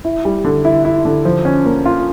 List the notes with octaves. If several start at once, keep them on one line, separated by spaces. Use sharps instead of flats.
E4
G3
D3
E4
E4
D3
F3
C#4
A#3
F4